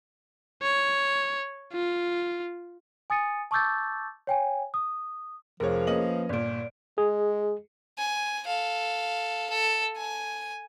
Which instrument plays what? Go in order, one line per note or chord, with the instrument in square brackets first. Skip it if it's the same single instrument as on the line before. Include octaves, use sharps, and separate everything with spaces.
[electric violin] C#5
F4
[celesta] G#5 D#6 A6 C#7 D#7
A5 C#6 D6 E6 G6 A6
C#5 G5 G#5
D#6
[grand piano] F1 C#5 [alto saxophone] F3 [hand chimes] G#4 A#4
[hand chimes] A#3 B4 [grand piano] C#4 D#5 F#7
[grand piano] G1 A#2 [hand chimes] D5 D7
[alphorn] G#3 [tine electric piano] G#4
[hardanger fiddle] G#5
A4 F5
A4
G#5